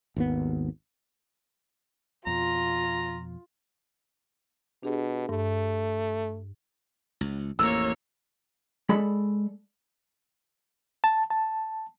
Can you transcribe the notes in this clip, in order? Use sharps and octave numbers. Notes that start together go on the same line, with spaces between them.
G#1 D#2 B3
F2 B2 F4 A#5
B2 D4 G4 G#4
G2 A3
C#2
A1 F2 A#3 C#5 E6
G#3 A4 D5 B5
A5
A5